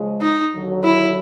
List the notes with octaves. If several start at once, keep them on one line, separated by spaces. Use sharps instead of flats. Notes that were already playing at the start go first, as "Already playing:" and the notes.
Already playing: C#3 F3 G#3
D#4
D#2 D3 F#3
E4